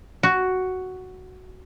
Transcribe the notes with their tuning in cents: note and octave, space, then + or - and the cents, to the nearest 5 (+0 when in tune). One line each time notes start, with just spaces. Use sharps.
F#4 +5